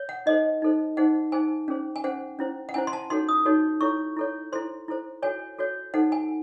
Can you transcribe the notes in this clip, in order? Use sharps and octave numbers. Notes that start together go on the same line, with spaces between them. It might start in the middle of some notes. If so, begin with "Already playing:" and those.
Already playing: C#5
F#5
D#4 A4 C5 D#5
D#4 A4 C5
D#4 G#4 C5 F#5
D#4 G#4 C5 G#5
C#4 G#4 C5
G#5
C#4 G#4 C5 F#5
C#4 E4 C5
F#5
C#4 E4 C5 G#5
C6
A5
D#4 F#4 A4 C#5 C6
D#6
D#4 F#4 A4 C#5
E4 A4 C#5 C#6
E4 A4 C#5
E4 A4 C5 C6
E4 A4 C5
F#4 A4 C#5 G#5
F#4 A4 C#5
D#4 A4 C5 F#5
G#5